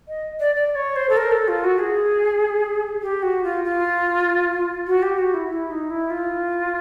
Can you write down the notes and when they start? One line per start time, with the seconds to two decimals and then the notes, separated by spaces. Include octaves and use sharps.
0.08 D#5
0.40 D5
0.55 D5
0.75 C#5
0.96 C5
1.09 A4
1.17 A#4
1.32 A4
1.48 F4
1.64 F#4
1.79 G#4
3.02 G4
3.23 F#4
3.44 F4
3.64 F4
4.87 F#4
5.02 G4
5.18 F#4
5.34 E4
5.50 E4
5.70 D#4
5.90 E4
6.10 F4